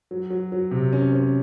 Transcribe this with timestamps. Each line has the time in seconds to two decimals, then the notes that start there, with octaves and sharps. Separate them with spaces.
0.11 F#3
0.30 F#3
0.52 F#3
0.71 C3
0.93 C#4
1.13 C#4